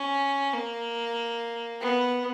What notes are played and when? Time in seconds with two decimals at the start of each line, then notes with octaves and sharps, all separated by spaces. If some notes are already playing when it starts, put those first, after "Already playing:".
Already playing: C#4
0.53 A#3
1.80 B3